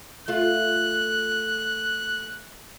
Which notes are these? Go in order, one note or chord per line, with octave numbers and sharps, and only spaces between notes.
A3 F4 F#6